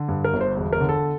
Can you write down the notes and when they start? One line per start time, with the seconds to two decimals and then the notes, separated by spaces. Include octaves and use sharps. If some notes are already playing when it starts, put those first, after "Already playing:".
Already playing: D3
0.09 G2
0.24 A#4
0.33 G1
0.41 C5
0.57 E1
0.73 A#4
0.80 D3
0.89 A4